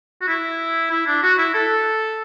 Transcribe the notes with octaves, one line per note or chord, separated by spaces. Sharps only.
F#4
E4
E4
D4
F#4
E4
A4